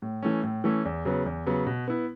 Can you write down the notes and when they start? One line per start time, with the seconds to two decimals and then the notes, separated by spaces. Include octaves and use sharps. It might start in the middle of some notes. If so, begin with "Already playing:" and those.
0.02 A2
0.23 E3 A3 C#4
0.43 A2
0.64 E3 A3 C#4
0.85 E2
1.05 C#3 F#3 B3
1.26 E2
1.46 C#3 F#3 B3
1.67 B2
1.88 B3 E4